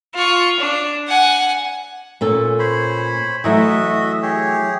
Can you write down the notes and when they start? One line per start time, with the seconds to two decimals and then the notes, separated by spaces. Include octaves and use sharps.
0.15 F4 C#6
0.60 D4
1.08 F#5 G#5
2.21 A#2 C#4 A4
2.59 C5 C#5 B5
3.44 E3 F#3 A3 F#4 D#5 E5
4.22 G4 G#4 C#5